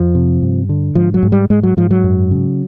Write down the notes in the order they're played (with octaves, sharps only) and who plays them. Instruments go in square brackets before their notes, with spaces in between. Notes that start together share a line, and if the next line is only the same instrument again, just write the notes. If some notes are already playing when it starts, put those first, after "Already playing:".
Already playing: [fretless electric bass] F2 F3
C3
G2
D3
G#2 F3
F#3
G#2
G3
G#2 G#3
F#3
G#2 F3
F#3
F#2
C#3